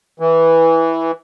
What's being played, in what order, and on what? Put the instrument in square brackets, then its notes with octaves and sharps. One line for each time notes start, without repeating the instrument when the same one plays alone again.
[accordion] E3